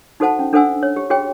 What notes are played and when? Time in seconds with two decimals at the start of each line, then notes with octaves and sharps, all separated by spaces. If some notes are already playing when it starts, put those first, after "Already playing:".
0.20 D#4 F#4 A4 C5 F#5 A5
0.39 C#4
0.53 D4 A4 C5 F#5 G#5 E6
0.83 C#5
0.96 G4
1.10 F#4 G#4 C#5 G5